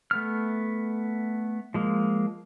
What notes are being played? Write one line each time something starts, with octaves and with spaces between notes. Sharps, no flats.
A3 B3 F6
F3 G#3 A#3